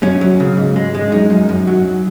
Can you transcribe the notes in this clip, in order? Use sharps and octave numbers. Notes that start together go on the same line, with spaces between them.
F#2 C#4
F#3
C#3
G#2
G#3
G#3
F#2 D#4
F#2
F#2
F#3